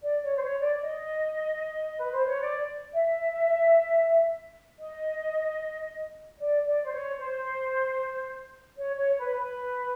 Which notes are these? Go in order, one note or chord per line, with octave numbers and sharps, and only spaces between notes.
D5
C#5
C5
C#5
D5
D#5
B4
C5
C#5
D5
E5
D#5
D5
D5
C5
C#5
C5
C#5
C#5
B4
B4